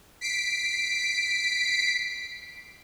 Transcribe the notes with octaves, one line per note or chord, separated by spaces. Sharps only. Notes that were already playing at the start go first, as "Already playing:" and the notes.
B6 C7 D7